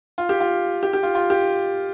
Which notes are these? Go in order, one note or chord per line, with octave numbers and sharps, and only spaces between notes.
F4
G4
F4
G4
G4
F4
F4
G4